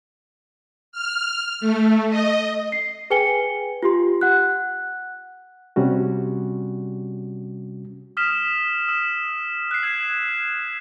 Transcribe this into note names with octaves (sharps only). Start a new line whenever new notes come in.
F6
A3
D#5
C7
G#4 B4 G5 G#5 C#7 G7
F4 G4 C6
F#5 F#6
C3 G3 C#4 F#4
D#6 F6 B6 E7
D#6 E6 E7
F#6 C7
E6 G#6 B6 C7 E7